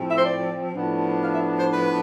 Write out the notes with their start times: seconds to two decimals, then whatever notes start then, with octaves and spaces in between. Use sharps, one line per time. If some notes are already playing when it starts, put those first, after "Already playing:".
Already playing: A2 F3 C4
0.08 E5
0.18 C5
0.25 D5
0.73 A2 F3 B3 D4
1.22 F5
1.35 E5
1.59 C5
1.71 B4